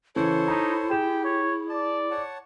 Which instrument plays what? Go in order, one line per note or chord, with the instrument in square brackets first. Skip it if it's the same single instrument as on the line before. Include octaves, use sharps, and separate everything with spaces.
[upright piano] C#3 E3 [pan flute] E4 [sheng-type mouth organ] A4 C5 C#5
[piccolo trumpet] D#4 [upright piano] A#5 B5
[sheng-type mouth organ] G4 [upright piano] G#4 E7 [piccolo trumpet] G5
[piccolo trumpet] C#5
[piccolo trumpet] D5 [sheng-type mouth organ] A5
[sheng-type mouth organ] C#5 F#5 A5